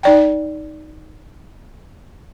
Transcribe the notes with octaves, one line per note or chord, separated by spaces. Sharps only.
D#4 D5 G5